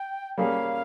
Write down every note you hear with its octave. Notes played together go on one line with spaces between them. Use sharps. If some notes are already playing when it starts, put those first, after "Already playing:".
Already playing: G5
G3 A#3 C#4 G#4 F5